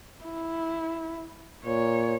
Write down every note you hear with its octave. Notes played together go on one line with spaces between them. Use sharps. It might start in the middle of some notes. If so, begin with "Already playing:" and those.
E4
A#2 C#5